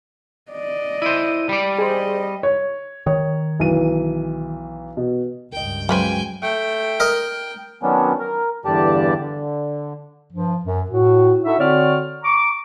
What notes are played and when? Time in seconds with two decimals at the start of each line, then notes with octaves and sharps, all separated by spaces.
0.52 D5 D#5
1.02 E4 C5 D#7
1.49 G3 D5
1.78 G#4 C5 D#5
2.43 C#5
3.07 D#3 C#5
3.59 B1 E3 D#7
4.97 B2
5.53 C#2 G2 A#4 D#5 G5
5.89 C#3 F#3 G#3 B4 C5 G5 G#5
6.43 A3 G5
7.00 A#4 D#5
7.83 D#3 F#3 B3 C#4 D4
8.19 A#4
8.65 E2 G2 D3 G4 D5 A5
9.18 D3
10.33 G2 F3
10.64 F#2
10.89 A2 F#4
11.45 D#4 E4 F#4 A4 E5
11.59 D3 C4 F#4 C#5 D5 F6
12.23 A#5 C#6 D6